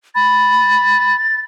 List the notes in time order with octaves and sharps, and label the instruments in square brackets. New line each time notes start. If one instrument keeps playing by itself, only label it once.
[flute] B5 [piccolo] A6